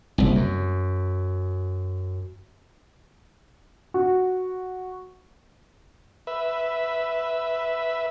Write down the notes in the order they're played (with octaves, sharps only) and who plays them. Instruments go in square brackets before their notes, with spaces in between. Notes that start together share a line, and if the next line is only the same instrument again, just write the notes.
[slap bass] F#1 C2
F#2
[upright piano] F#4
[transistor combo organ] B4 E5